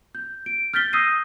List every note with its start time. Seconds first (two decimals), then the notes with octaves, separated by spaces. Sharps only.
0.15 G6
0.46 D7
0.74 F6 G6 A6 B6 G7
0.93 D#6 E6 G6 A#6 C7 D#7